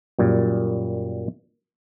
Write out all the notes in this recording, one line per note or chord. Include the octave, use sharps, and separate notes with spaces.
F#2 A#2 G3